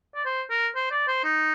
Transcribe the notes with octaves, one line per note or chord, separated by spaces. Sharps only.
D5
C5
A#4
C5
D5
C5
D#4